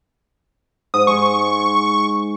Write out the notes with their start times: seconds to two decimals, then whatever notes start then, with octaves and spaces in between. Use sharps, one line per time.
0.94 G#2 D#6
1.07 G#3 C#6